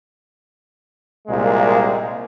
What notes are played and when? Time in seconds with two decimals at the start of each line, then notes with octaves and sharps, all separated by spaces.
1.28 C2 A#2 G#3 A#3